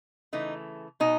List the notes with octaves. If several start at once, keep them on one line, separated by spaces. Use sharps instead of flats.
C#3 E3 A3 D#4
B2 D#4